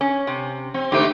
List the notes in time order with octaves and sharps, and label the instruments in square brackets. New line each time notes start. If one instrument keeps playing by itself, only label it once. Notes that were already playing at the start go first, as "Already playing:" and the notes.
[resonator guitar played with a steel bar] C#4
C3
[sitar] C4
[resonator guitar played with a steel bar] G#2 A3 [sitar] D3 C4 G4